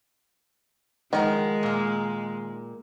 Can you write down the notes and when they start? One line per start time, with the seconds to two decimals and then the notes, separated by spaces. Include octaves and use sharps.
1.13 D#3 F3 G#3 A#4 F#5
1.63 A#2 A#3